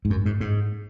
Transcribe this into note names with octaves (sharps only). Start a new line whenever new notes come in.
G#2
F#2
G#2
G#2